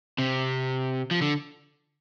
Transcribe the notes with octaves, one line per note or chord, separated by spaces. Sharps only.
C3
F3
D3